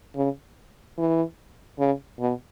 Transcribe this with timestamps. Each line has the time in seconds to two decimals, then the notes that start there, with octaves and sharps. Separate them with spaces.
0.16 C#3
0.98 E3
1.79 C#3
2.19 B2